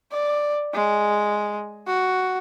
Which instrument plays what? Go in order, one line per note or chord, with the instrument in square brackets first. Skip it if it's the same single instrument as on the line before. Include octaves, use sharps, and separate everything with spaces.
[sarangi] D5
G#3
F#4